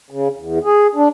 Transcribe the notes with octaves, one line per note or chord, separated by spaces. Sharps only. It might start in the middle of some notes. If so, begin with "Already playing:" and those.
C#3
E2
G#4
D4